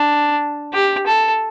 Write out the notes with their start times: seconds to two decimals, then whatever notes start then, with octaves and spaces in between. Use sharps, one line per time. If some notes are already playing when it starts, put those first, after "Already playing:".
Already playing: D4
0.74 G4
1.07 A4